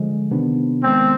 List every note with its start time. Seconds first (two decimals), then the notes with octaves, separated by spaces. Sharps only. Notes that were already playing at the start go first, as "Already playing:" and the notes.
Already playing: D3 F3 G#3
0.31 C3 D#3 B3 D4
0.83 D#3 G#3 B3 C4